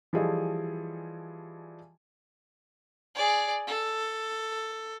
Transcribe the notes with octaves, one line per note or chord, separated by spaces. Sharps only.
E3 F3 G3 G#4 A4 D#5
G#4 D5
A4